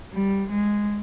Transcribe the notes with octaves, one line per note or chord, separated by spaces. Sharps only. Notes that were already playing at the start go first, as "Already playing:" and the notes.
G3
G#3